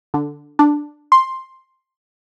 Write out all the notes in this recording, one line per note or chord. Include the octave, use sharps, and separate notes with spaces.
D3
D4
C6